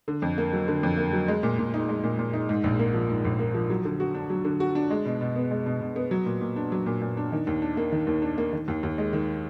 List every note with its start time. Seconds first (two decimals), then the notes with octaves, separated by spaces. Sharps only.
0.08 D3
0.22 F2
0.38 A#3
0.53 F#3
0.68 D3
0.83 F2
0.98 A#3
1.13 F#3
1.28 G#3
1.43 A#2
1.59 A#2
1.74 D#4
1.89 G#3
2.04 A#2
2.19 A#2
2.33 D#4
2.49 G#2
2.64 A#1
2.79 A#3
2.94 F3
3.09 G#2
3.25 A#1
3.39 A#3
3.54 F3
3.70 F#3
3.85 D3
4.00 F#4
4.14 D4
4.30 F#3
4.44 D3
4.60 F#4
4.75 D4
4.90 G#3
5.05 B2
5.21 B2
5.36 B3
5.51 G#3
5.66 B2
5.81 B2
5.96 B3
6.11 F#3
6.26 A#2
6.41 A#2
6.56 D4
6.72 F#3
6.86 A#2
7.01 A#2
7.17 D4
7.32 D#3
7.47 D#2
7.62 D4
7.77 A#3
7.92 D#3
8.07 D#2
8.22 D4
8.38 A#3
8.53 D#3
8.68 D#2
8.83 D#2
8.98 G#3
9.13 D#3